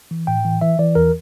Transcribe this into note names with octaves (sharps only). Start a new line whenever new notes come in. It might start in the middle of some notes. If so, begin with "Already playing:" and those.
E3
A2 G5
E3
E3 E5
E3 D5
E2 A#4